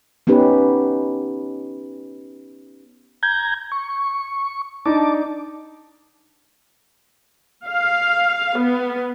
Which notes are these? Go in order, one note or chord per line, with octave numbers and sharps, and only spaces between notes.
B3 C#4 D#4 G4 B4
A#5 G6 G#6
C#6
D4 D#4 A5 D6
F5
B3